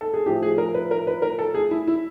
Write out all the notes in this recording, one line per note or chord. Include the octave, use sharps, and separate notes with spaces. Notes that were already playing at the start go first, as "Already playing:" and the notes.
A4
G#4
A2 F3 G4
G#4
A#4
B4
A#4
B4
A#4
A4
G#4
E4
E4